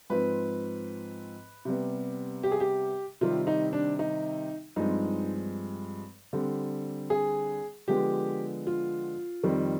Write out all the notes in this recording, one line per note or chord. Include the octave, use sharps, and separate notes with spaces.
G#2 F3 C4 B4
C3 G3 B3
G4
G#4
G4
C3 D#3 G3 C4 F4
D#4
D4
D#4
G2 F3 G#3 C4 D#4
D3 G3 C4
G#4
D3 F3 G#3 B3 G4
F4
F2 D#3 G3 C4